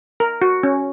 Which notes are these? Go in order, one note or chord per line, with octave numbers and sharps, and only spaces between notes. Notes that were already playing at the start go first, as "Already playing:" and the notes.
A#4
F#4
C#4